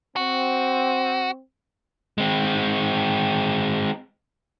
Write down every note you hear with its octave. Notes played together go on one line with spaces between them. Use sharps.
C4 F#4
G#3 C4